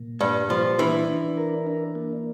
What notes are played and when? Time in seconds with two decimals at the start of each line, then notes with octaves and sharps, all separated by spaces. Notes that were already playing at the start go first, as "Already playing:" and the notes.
Already playing: A#2
0.21 G2 G3
0.49 A#2 F3
0.79 E3 D4
1.08 D4
1.37 A#4
1.67 D4
1.95 A#3